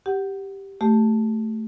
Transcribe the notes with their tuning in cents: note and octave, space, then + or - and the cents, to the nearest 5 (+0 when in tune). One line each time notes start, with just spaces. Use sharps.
G4 +0 F#5 +15
A3 +0 G4 +0